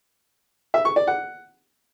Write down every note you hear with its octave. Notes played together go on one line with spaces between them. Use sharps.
E5
C#6
D5
F#5